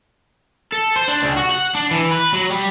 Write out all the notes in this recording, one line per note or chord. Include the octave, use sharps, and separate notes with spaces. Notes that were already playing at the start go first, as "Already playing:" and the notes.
A4
C5
D4
C#2
F#4
F#5
D4
E3
B4
F#3
G3